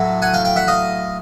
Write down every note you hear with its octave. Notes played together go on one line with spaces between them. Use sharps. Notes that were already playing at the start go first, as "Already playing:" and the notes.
Already playing: A2 F#3 A3
F#5 G#5
F5 G5
F5 G5
E5 F#5
D#5 F5